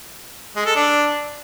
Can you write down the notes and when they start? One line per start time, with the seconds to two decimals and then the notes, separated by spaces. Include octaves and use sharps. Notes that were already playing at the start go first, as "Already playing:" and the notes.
0.56 G#3
0.66 A4
0.76 D4